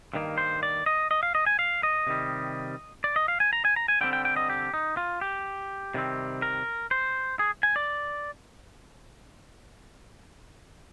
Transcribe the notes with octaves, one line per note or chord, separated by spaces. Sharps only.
G2 D#3 A#3
C5
D5
D#5
D#5
F5
D#5
G#5
F5
D#5
C3 D#3 G3
D5
D#5
F5
G#5
A#5
G#5
A#5
G#5
D3 G3 C4 G5
G5
G5
D#5
G4
D#4
F4
G4
C3 D#3 G3 C4
A#4
C5
G#4
G#5
D5